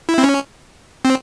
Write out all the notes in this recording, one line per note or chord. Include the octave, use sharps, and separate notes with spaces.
E4
C4
C#4
C4